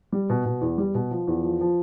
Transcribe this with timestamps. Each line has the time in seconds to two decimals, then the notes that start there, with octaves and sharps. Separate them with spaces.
0.12 G3
0.30 B2
0.45 B2
0.61 E2
0.78 G3
0.94 B2
1.11 F3
1.27 E2
1.44 F3
1.61 F3